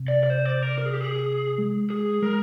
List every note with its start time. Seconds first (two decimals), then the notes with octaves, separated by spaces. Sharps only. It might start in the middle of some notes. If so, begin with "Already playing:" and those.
Already playing: C3
0.08 D5
0.24 D5
0.30 C5
0.45 D5
0.62 A#4
0.78 A#4
0.86 G#4
0.93 G4
1.01 G#4
1.58 G#3
1.90 G#4
2.22 G#3 A#4